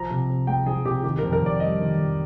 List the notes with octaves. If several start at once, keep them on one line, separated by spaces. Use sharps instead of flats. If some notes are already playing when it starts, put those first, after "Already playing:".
Already playing: F3 A#5
C3
C3
G#3 G5
F3 G#4
C3 G4
D#3 G4
F2 A#4
A#4
F2 D5
G3 D#5
D#3
F2